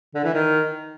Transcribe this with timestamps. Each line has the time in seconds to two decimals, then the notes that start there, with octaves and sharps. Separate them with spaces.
0.15 D3
0.24 E3
0.34 D#3